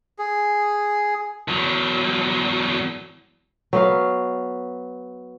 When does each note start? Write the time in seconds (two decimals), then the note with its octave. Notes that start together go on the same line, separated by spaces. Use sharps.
0.19 G#4
1.48 E2 F#3
3.73 F#3 B3 F5